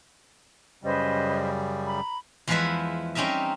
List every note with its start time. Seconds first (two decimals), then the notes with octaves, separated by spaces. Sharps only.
0.84 F#2 C#3 G3 B4 C5 D#5
1.86 A#5 B5
2.48 E2 F3 G#3 E4 B4 E5
3.15 G3 C4 C#4 D#4 A#4 E5